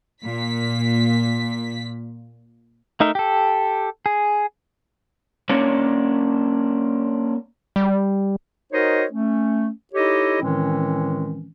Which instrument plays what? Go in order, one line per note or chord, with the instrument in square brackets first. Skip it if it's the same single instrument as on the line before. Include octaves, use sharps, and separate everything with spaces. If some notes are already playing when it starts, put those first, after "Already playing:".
[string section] A#2 B6
[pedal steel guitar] A3 D#4 A#4 E5
G4 A4
G#4
[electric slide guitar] A#3 C#4 D4 C#5 D5
[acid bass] G3
[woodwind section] D#4 F#4 A#4 C5 C#5 D#5
A3 C#4
D#4 E4 G4 A4 C#5 D#5
A2 D#3 E3 G#3 C4 C#4